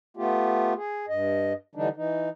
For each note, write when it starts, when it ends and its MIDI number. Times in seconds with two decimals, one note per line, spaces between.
0.17 0.74 57
0.17 0.74 59
0.17 0.74 65
0.17 0.74 67
0.77 1.06 68
1.09 1.53 43
1.09 1.53 75
1.75 1.89 50
1.75 1.89 52
1.75 1.89 55
1.75 1.89 62
1.75 1.89 63
1.96 2.29 52
1.96 2.29 63